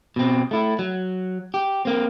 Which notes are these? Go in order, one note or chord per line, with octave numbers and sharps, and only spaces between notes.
B2 C4
A3 E4
F#3
G4
A#3 C4